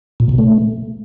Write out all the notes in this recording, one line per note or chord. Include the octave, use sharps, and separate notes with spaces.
A#2
B2
A3